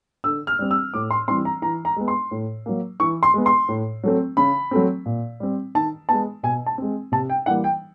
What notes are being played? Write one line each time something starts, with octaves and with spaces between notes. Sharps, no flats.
D3 E6
F6
G3 C4
E6
A2 D6
C6
E3 G3 C4 C6
A#5
E3 A#5
A#5
G#3 B3
C6
A2
F#3 A#3
E3 C#6
C6
G#3 B3
C6
A2
F#3 A3 C4
C#3 B5
F#3 A3 C4
A#2
G3 C4
D#3 A5
G#3 B3 A5
B2 G#5
A5
G#3 C4
C3 A5
G5
E3 G3 A#3 F#5
G5